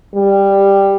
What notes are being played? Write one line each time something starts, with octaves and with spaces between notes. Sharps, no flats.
G3